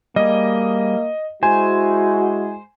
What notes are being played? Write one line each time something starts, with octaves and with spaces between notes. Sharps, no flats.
G3 A#3 G#4 D#5
G#3 E4 F#4 C5 G#5